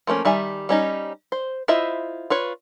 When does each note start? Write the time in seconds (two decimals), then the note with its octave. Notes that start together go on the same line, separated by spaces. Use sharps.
0.07 F3 A3 A#3 C#4
0.25 D#3 G3 E5 G#5
0.69 G3 C#4 D#4
1.32 C5
1.68 E4 F4 C5 D#5 E5
2.30 F4 B4 C#5